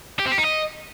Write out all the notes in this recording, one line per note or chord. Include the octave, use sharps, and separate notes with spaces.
G4
C4
G4
D#4
D#5